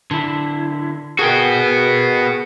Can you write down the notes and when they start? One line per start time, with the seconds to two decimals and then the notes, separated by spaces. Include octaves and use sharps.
0.11 D3 E4
1.19 B3 F#4 G#4 A#4 G5